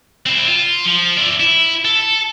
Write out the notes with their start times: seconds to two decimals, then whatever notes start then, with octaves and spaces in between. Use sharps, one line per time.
0.26 C4 E4
0.48 F4
0.86 F3
1.18 E4 D5
1.40 E4
1.85 A4